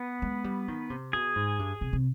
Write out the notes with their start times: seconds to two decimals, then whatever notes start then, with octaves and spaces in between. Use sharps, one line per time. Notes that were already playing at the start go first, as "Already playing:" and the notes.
Already playing: B3 B4
0.22 G#3
0.44 G3
0.68 D#3
0.90 C3
1.13 B2 G#4 G#5
1.36 G#2
1.59 G2
1.81 C3
1.93 C3